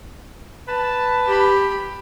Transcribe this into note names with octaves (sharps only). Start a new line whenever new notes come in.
B4 A5
G4 B5